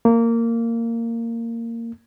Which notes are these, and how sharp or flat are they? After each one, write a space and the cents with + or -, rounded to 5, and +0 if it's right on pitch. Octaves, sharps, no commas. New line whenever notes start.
A#3 -15